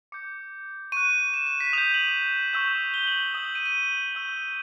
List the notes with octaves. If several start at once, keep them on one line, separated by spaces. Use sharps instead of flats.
D6 G6 C#7
C#6 F#6 D#7
E7
E7
B6
D#6 G6 F7
F#7
C#6 E6 G6
G7
F#7
D#6 G6 F#7
F#7
D#7
D#7
C#6 E6 G6